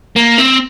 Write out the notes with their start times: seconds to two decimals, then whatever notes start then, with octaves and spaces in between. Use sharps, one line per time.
0.16 A#3
0.38 C4